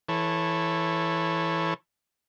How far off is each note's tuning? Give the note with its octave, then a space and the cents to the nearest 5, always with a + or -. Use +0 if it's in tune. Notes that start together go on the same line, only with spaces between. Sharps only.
E3 +0 A4 +0 C#5 -20